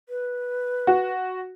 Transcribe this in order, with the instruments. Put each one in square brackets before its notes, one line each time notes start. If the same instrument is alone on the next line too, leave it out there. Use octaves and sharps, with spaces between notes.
[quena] B4
[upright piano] F#4